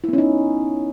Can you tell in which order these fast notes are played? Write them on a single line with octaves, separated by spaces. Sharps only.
E4 B3 C#4 D#4